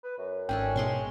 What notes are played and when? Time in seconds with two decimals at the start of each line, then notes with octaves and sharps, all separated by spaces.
0.04 B4
0.18 F#2
0.49 G#1 G#2 C#4 D4 A4 G5
0.76 B2 G#3 C#5 C6 C#6